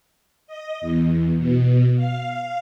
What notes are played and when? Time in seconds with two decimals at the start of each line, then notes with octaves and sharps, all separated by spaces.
0.47 D#5
0.81 E2
1.37 B2
1.96 F5